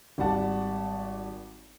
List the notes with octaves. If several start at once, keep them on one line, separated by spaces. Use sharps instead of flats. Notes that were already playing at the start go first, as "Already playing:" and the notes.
G#1 G3 F#5 A5